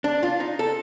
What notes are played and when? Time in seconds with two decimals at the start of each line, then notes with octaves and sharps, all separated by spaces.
0.04 D4
0.23 F4
0.40 D#4
0.59 A4